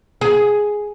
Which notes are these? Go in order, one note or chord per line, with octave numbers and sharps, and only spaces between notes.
G#4